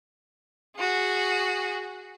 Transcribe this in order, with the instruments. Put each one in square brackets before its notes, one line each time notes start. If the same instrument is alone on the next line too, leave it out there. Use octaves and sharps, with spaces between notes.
[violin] F#4 G#4